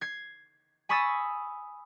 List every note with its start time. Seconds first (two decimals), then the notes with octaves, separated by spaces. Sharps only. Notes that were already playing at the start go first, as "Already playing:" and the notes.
0.01 G#6 C7
0.89 G#5 B5 C#6 D#6 E6 A6